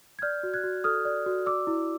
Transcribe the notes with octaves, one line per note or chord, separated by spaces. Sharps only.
G#6
D5 F6 G6
F#4
F#6 G#6
F#4
A4 D#6 F6
D5
F#4
D5 D6 E6
E4